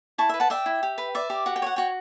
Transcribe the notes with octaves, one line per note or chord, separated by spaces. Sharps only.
E4 A5 C#6
B4 E5
F#5 A5
D5 E5 G5
E4
G4
B4
D5 E5
G4
F#4 F#5
G5
C#5 F#5
F#4 G5